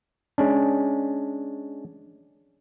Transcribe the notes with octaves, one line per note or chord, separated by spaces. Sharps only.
G#3 C#4 D4